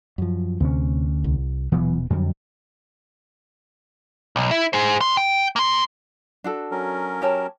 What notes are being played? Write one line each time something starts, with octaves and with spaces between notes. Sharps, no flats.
F#2 F3
D2 C3 C#4
C2
D#1 B2 E3 F#3 B3
F2 D3 F#3 G3
B1
E4
G#4 C5
F#2 C6
G5
A#3 C6
D4 F#4 A4
F#3 C#4 A#4
G4 C#5 A5